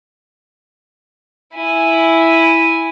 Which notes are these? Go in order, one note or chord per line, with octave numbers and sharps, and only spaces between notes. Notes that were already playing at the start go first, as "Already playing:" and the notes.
E4 G#5